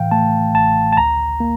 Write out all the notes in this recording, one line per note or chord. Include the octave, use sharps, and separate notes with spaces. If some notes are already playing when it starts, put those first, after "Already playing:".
Already playing: A2 E3 F5 G5
A3 A5
A1 A5
A5
D2 A#5
A#3